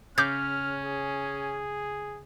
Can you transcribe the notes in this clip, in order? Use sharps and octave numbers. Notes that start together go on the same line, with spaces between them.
C#3 C#4 D6 F6 G6
G#4